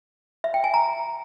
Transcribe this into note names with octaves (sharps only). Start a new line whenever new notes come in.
E5
G5
G#5
A#5